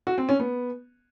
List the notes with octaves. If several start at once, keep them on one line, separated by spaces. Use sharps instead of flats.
F#4
C4
C#4
B3